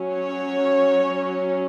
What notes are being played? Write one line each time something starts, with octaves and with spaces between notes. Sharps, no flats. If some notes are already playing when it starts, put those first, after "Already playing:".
Already playing: F#3 C#4
C#5